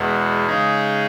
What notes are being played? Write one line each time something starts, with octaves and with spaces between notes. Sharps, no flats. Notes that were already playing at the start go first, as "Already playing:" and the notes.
Already playing: E2 B2 G#3 B3
C#3 G#3 D#4 G#4